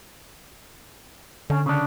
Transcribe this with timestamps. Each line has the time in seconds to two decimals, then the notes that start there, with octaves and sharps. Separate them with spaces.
1.50 D3 C#4
1.66 C#3 D4